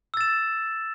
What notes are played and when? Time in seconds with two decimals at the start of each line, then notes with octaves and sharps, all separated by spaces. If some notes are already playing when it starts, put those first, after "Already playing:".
0.14 E6
0.17 A6
0.21 E7